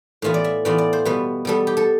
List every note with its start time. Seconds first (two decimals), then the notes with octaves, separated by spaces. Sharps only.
0.22 A2 E3 B3 F4 E5
0.34 D5
0.44 E5
0.65 A2 E3 B3 F4 D5
0.78 D5
0.93 C5
1.05 B2 G3 B3 B4
1.45 B2 G3 B3 A4
1.67 G4
1.77 A4